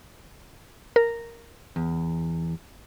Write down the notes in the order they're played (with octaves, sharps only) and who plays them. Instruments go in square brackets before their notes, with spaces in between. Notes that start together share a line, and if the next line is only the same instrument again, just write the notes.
[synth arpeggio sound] A#4
[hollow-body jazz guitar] E2